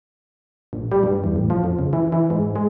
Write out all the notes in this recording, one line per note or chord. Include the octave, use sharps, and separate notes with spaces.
A#1
G3
G2
E2
A1
F3
F2
C#2
E3
E3
G#2
G#3